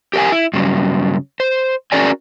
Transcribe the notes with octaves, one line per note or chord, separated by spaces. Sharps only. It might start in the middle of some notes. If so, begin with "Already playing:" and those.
G4 A#4 B4 F5 G#5
E4
G2 C#3 F#3
C5
C#4 F#4 G#4 A#4 D5 G#5